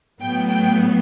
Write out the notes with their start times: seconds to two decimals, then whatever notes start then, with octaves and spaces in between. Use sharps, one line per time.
0.21 A2 F#3 B3 G5
0.49 G5